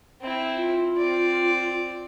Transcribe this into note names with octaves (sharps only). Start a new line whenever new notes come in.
C4 E4
F4
C4 D5